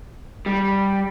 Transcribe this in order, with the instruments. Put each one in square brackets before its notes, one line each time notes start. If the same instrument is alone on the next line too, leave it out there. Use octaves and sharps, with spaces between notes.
[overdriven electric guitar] G3